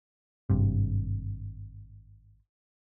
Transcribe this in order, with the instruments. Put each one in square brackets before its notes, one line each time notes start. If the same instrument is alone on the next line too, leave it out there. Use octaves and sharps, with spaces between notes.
[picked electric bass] G#1 G2 C3